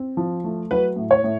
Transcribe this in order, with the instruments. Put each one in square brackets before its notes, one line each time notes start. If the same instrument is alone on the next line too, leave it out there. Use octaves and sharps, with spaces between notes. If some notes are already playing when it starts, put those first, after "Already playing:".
Already playing: [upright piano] C4
F3
A3
F#3 B4
A2
C#5
A2